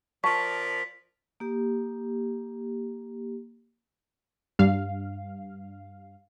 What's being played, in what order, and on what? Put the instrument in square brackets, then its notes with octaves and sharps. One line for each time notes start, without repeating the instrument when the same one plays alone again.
[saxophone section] F3 A#4 D5 [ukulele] A5 [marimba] C#6 [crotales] B6
[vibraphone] A#3 G4
[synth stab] G2 F5